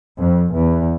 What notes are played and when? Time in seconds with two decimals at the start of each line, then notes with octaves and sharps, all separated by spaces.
0.18 F2
0.52 E2